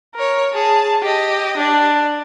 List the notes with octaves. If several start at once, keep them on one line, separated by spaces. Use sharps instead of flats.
A#4 C#5
G#4 A5
G4 D#5
D4 D5